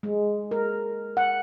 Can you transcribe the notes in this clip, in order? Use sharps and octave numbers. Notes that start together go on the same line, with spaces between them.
G#3
A#4
F#5